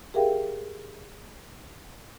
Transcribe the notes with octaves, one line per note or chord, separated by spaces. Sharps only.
G4 G#4 A#4 E5 F5 G5